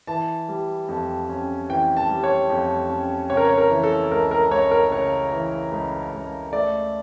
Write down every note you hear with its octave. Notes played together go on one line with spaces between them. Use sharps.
E3 A5
G3
F2
C#4
E3 G5
A5
G3
C#5
F2
C#4
C#3 C#5
A#4
C#5
A#4
E3
A4
C#2 A#4
A#4
C#2 C#5
A#4
C#3 C#5
E3
C#2
C#2
A3 D5